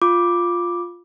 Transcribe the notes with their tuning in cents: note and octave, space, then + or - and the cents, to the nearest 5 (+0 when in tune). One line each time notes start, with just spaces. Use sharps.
F4 +0 D6 +0